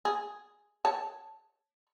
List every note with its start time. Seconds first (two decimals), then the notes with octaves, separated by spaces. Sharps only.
0.05 G#4
0.85 C#5 A5